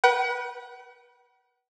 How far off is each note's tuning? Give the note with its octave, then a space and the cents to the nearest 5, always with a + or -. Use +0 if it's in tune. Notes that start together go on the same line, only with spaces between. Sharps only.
B4 -30 F#5 +40